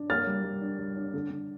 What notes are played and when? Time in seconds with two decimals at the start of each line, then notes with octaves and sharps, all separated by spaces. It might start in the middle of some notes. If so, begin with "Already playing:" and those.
Already playing: D4
0.10 A#3 F6 A6
0.27 G3
0.44 G3
0.62 D4
0.79 G3
0.97 D4
1.14 D3
1.31 D3